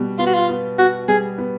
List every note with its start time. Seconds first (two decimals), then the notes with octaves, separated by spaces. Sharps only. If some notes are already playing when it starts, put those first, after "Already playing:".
Already playing: B2 G3
0.19 B3 F4
0.27 F#4
0.34 F4
0.49 B3
0.78 B3 F#4
1.08 G3 G#4
1.38 B3